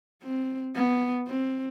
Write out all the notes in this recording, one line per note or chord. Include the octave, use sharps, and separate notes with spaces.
C4
B3
C4